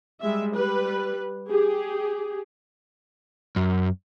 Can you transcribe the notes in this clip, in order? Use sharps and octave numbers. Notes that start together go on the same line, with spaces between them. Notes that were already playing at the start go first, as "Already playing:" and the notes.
G3 G#3 E5
G3 B4
G4 G#4
F#2